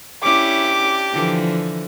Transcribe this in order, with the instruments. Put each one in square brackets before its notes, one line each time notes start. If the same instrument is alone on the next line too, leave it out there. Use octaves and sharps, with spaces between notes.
[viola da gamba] C#4 E4 [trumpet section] D4 G4 [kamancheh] D6
[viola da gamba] D3 E3 F3